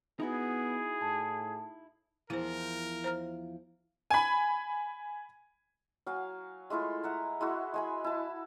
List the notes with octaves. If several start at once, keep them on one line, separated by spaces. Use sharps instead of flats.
B3 D#4 E4 F#4 G#4
A2 A5
E2 F3 E4 A#4 C5
C5 A#5 F6
G#5 B5
F#3 F5 G#5
G#3 A3 E4 F4
E5 F#5 A#5
G#3 E4 F#4
G#3 G#5 B5
E4 A5